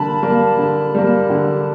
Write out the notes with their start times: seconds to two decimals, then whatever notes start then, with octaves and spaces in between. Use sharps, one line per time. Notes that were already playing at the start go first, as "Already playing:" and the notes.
Already playing: D3 G3 A#3 A5 B5
0.22 G3 A#3
0.58 D3
0.94 G3 A#3
1.30 D3